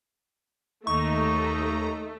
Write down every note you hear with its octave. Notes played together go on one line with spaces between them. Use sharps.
D#2 A3 D#4 A#5 C#6